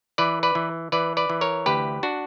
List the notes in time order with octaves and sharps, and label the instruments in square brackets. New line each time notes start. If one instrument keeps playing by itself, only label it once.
[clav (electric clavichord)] E3 B4 D5
B4 D5
E3
E3 B4 D5
B4 D5
E3
A#4 C#5
D2 G4 B4
D4 F#4